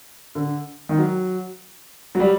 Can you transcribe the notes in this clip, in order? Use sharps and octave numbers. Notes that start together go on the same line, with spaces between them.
D3
D#3
F#3
F#3
G3